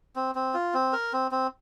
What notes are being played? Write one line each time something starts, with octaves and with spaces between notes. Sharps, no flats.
C4
C4
F4
C4
A#4
C4
C4